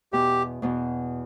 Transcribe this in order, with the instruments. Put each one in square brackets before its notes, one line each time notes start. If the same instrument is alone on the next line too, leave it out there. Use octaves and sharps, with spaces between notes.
[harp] E2 B2 B3 [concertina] G4
[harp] E2 B2 B3